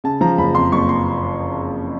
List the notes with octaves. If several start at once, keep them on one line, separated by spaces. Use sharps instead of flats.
C#3 A5
F3 A#5
F#1 B5
F2 C6
F#1 C#6
C6